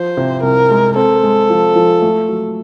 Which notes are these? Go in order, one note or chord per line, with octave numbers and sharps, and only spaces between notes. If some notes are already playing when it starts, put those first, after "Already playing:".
Already playing: F3 C5
C3
C2 A#4
G#3
C4 A4
G#3
F3
F3
A3
F#3